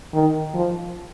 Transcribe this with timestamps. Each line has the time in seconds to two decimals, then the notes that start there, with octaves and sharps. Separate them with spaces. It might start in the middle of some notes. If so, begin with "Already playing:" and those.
0.14 D#3
0.54 F3